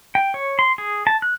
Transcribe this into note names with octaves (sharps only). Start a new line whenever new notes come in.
G5
C#5
C6
G#4
A5
F#6